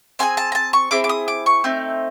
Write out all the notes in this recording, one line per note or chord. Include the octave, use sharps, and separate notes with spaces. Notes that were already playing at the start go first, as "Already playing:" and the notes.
C4 F4 G#4 G#5
A5
A#5
A5
C#6
C4 E4 G#4 D6
D6
D#6
D6
C#6
A3 C4 D#4